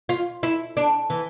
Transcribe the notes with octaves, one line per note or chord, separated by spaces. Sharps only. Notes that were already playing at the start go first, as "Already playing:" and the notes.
F4
E4
D4
E3